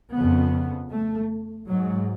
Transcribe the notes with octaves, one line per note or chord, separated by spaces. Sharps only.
F2 C#3 B3
A3
G#2 F#3